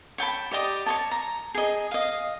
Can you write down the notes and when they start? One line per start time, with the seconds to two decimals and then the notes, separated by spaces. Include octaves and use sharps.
0.18 C#5 G5 A5 B5
0.51 G4 D5 D#5 D#6
0.86 C#5 D#5 A5
1.11 A#5
1.55 G#4 D#5
1.91 D#5 F5